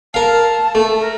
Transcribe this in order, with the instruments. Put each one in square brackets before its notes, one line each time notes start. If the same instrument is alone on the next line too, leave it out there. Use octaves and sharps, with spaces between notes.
[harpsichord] A#4 F5 [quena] A5
[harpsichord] A3
[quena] A#4